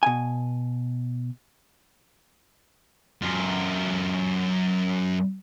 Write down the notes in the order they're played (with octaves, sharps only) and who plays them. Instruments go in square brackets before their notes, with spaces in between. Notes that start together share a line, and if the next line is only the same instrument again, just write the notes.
[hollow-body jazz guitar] B2 G#5
[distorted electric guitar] F#2 F4